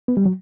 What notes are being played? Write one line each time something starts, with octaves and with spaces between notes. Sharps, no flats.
B3
G3
F#3